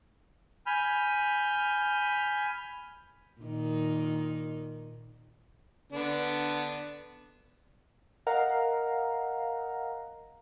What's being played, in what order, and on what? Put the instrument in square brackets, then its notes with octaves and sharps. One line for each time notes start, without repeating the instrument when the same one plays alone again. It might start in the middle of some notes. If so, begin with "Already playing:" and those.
[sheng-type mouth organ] G#5 B5 F6 G6
[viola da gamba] A#2 D#3
[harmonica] D3 B3 D4
[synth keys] A#4 D#5 F5 F#5 A#5